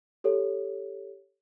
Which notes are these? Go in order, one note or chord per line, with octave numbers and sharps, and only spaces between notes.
G4 A4 C#5